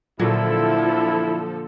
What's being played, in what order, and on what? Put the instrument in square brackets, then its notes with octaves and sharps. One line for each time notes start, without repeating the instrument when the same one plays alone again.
[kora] A#2 F#3 [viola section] D3 F3 A4 [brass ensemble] E4